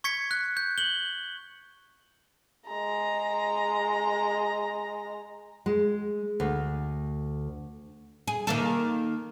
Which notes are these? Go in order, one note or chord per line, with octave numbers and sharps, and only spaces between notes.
C#6 G#6 B6 C#7
F#6
G6
F#7 G7
G#3 A#5
G#3
D2
G#4
D#3 A#3 A4